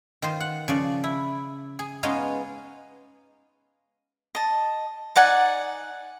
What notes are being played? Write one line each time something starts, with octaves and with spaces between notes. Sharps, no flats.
D#3 F4 C5
F#5
C#3 F3 D5
E4
G#4
G#3 B3 C#4 D#4 F4 G#4
D#5 A5
D#4 D5 F#5 G#5